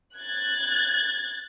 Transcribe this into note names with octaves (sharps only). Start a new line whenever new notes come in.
F#6 G#6 A6